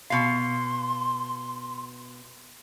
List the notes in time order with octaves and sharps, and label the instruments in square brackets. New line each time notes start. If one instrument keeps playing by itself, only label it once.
[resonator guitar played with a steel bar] B2 F5 [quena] C6